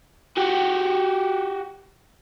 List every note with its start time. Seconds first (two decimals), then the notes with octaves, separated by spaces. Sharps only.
0.37 F#4 G4